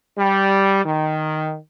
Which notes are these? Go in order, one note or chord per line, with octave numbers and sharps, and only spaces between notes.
G3
D#3